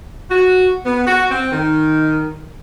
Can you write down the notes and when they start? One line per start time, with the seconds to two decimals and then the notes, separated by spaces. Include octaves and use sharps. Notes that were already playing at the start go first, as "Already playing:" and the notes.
0.30 F#4
0.85 B3
1.06 F#4
1.31 C4
1.52 D#3